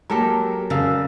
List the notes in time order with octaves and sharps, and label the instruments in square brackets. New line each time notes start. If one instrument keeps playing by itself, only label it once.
[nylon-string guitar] F#3 G#3 A#3 [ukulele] G4 A4 A#4 [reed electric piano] A#5
[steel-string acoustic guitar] C#3 [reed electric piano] A#4 E6 [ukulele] D5 F5